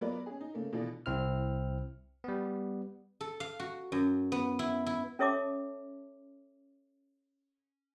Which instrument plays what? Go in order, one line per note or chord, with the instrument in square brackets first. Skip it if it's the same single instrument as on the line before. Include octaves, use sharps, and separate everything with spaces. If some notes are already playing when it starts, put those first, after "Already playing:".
[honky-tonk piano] F#3 B3 F4 A#4 B4 D5
C#4 G#4
D#4
C#3 A3 A#3
B2 D3 E3 D4 F4 A4
[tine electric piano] C2 C4 E4 F6
G3 B3
[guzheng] A4
F5
F#4
F#2
B3
E4
E4
[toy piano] C#4 A4 C#5 E5 A5 D6